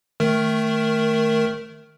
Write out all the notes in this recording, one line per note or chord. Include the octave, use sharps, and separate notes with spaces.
D#3 A3 A#4